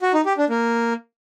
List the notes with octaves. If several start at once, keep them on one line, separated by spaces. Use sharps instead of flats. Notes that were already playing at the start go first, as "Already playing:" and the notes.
F#4
D#4
G4
D4
A#3